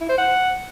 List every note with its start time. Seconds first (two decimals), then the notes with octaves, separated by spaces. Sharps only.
0.01 E4
0.09 C5
0.18 F#5